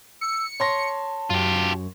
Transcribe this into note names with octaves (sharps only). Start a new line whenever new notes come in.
E6 C#7
C#5 A5 C6 A#6
F#2 F4 G4